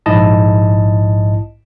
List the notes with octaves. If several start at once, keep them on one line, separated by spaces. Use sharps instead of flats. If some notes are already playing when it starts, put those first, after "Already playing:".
A#1 G#2 E4 D#5 A5